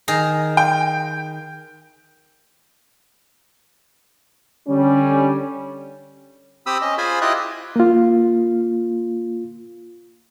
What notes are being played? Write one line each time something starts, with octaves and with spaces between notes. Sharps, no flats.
D#3 G#4 A#5
G5
D3 G3 C#4
C4 G4 B5 D#6 E6
C#4 D#5
F4 G#4 C5 G#5 B5
E4 F4 G4 D#5 D#6 F#6
A#3 F4